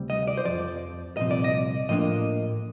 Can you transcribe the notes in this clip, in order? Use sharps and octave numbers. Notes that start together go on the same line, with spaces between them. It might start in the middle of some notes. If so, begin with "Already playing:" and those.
Already playing: D2 C3 G3 C4
D#5
D5
C5
F2 C3 F3 D5
C2 A#2 F3 C4 D#5
D5
D#5
A2 F3 A#3 D4 D#5